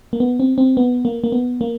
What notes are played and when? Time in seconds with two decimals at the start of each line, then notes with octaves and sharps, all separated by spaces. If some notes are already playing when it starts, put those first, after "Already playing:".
0.13 A#3
0.20 B3
0.40 C4
0.58 C4
0.77 B3
1.05 A#3
1.24 A#3
1.32 B3
1.61 A#3